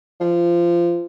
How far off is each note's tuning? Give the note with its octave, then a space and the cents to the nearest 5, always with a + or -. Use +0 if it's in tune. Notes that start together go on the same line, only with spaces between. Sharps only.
F3 -20